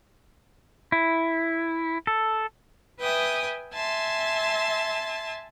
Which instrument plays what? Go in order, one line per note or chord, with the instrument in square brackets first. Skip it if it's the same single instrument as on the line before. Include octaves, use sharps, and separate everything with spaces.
[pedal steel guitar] E4
A4
[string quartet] B4 E5 G5 G#5 D#6
E5 G#5 A5 C6